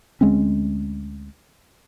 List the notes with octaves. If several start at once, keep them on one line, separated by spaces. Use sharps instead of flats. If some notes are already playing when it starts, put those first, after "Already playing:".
D2 G#3 C4 C#4